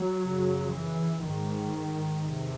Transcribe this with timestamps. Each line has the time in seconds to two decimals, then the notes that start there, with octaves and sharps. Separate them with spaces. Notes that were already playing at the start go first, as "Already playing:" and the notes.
Already playing: F#3
0.22 F#2 C#3
0.72 E3
1.22 G#2 D#3
2.22 E2 C3